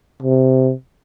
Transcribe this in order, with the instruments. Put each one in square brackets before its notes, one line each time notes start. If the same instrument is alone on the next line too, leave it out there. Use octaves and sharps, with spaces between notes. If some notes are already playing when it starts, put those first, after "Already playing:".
[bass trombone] C3